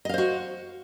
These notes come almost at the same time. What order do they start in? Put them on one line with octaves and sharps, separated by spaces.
D#5 F5 C5 F#4